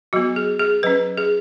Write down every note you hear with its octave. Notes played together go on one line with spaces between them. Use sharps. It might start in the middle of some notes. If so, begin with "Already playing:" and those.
F#3 B3 F#4
G#4
G#4
F#3 C#4 B4
G#4